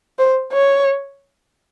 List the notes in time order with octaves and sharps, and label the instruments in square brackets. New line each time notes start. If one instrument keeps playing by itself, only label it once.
[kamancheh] C5
C#5